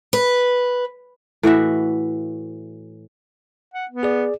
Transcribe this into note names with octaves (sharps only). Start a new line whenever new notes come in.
B4
A2 E3 F#4 E5
F#5
B3
G#4 D5